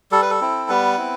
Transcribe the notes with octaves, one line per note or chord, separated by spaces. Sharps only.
G3 A4
B4
A4
C4 E4
G3 B3 B4
C4 E4